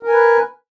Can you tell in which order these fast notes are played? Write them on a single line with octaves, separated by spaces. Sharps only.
A#4 G#5 B4